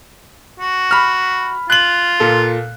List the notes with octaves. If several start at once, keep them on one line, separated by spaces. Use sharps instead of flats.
F#4
B5 F6
F4 F#6 F#7
A#2 A4